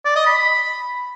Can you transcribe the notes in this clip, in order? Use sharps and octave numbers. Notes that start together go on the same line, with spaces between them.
D5
D#5
B5